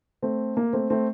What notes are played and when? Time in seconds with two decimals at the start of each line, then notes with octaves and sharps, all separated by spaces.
0.22 A3 C4
0.57 A#3
0.73 A3 C4
0.90 A3 C4